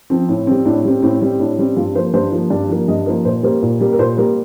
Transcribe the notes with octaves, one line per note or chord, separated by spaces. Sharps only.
F3 C4
A2
G3 C4
A2 D4
G3 C4
A2 C4
G3 C4
A2 D4
G3 C4
G2 F4
F3 A#3 C5
G2 C5
F3 A#3
G2 D5
F3 A#3
G2 D#5
F3 A#3 C5
A#2 C5
G3 A#3 C5
A#2
G3 A#3
A#4
A#2 C5
G3 A#3 A#4